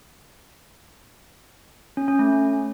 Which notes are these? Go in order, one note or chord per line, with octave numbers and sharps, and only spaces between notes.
C#4
C#4
A3